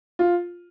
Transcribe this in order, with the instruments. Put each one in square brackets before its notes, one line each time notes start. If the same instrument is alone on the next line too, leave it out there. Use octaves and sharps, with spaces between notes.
[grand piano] F4